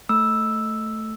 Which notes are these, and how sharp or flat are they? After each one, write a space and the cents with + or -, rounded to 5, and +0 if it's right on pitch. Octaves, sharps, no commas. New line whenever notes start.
A3 +0 E6 +0